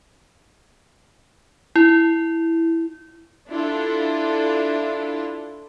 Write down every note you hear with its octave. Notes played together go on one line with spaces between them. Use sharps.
E4
D4 E4 F4 A4